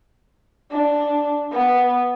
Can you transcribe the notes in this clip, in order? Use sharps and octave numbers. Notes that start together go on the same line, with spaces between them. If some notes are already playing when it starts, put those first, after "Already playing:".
D4
B3